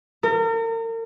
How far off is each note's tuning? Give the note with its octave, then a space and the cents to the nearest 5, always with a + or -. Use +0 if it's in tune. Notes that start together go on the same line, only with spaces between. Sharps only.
A#4 -40